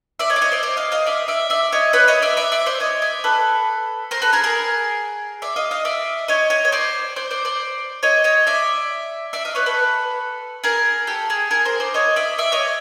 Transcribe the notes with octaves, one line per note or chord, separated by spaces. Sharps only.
D5 E5
C#5 D#5
D5
C#5 D#5
C5 D5
C5 D5
D#5 F5
D#5 F5
D5 E5
D5 E5
D5 E5
C#5 D#5
B4 C#5
C#5 D#5
D5 E5
D5 E5
D5 E5
C5 D5
C#5 D#5
D5 E5
A4 B4
A#4 C5
A4 B4
G#4 A#4
G#4 A#4
D5 E5
D#5 F5
D#5 F5
D5 E5
C#5 D#5
C#5 D#5
C#5
C5 D5
C5 D5
C5 D5
C5 D5
C#5 D#5
C#5 D#5
D5 E5
D5 E5
D#5 F5
B4 C#5
A4 B4
G#4 A#4
G4 A4
G#4
G#4 A#4
A#4 C5
C5 D5
C#5 D#5
D5 E5
D5 E5
C#5 D#5